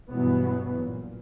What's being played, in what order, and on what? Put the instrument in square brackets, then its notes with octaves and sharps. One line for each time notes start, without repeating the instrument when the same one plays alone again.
[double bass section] G2 B2 E3 F#3 B3
A#2